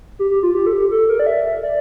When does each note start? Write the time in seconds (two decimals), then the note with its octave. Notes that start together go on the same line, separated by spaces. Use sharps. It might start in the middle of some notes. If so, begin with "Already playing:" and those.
0.19 G4
0.31 G4
0.43 F4
0.55 G4
0.66 A4
0.73 G4
0.91 A4
1.09 A#4
1.20 D5
1.26 E5
1.63 D5